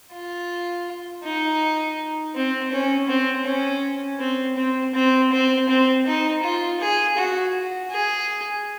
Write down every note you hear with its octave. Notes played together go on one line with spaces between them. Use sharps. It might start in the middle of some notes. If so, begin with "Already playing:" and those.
F4
D#4
C4
C#4
C4
C#4
C4
C4
C4
C4
C4
D#4
F4
G#4
F#4
G#4